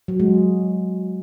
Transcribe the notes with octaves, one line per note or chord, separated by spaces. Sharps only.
F#3
G#3